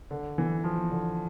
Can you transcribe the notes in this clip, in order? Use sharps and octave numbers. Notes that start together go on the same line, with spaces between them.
D3
E3
F3
D3